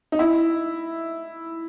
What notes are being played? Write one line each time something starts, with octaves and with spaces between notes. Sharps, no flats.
D#4
E4